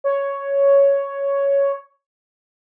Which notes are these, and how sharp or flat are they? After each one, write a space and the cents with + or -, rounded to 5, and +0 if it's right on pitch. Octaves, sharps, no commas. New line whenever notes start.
C#5 +5